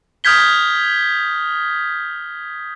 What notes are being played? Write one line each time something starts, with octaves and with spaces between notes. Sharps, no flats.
D#6 F6 G6 G#6 B6 G7